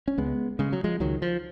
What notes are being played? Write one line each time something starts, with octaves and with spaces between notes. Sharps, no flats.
C#4
C#2 G#3 B3
C#3 G#3
F#3
F3 G#3
C#2 D#3 F#3
F3